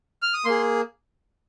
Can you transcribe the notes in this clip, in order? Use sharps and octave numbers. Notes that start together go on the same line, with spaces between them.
F6
D#6
A#3 G#4 C6